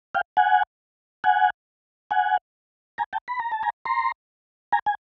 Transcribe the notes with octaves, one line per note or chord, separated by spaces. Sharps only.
F5 G5
F#5 G#5
F#5 G#5
F#5 G#5
G#5 A#5
G5 A5
B5
A#5
A5
G#5 A#5
A#5 C6
G#5 A#5
G#5